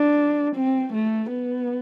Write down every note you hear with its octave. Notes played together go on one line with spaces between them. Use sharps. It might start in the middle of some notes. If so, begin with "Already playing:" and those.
Already playing: D4
C4
A3
B3